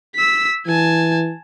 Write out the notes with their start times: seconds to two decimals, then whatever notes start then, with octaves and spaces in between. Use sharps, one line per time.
0.15 E6 B6
0.67 E3 G#5 A5